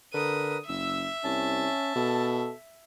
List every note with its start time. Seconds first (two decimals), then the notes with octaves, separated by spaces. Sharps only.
0.14 D3 A#4 B4 D#6
0.68 F#1 E5 E6
1.24 C2 C#4 A5
1.96 B2 A4